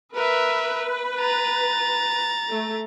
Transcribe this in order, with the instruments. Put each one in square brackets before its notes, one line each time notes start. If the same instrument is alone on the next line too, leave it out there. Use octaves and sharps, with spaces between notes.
[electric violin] A#4 E5 [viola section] B4
[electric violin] A#5 A6
[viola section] A3